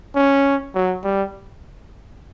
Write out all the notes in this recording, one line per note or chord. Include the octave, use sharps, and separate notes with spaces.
C#4
F#3
G3